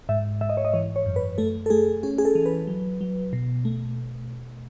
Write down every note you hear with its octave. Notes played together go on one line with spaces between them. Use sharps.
G#2 E5
G#2 E5
D#5
C#5
D#5
E3 C#5
C#5
F#2
B4
A3 A4
A4
A3 G#4
C#4 G#4
G#4
A4
E3
B4
F#3
F#3
B2
A3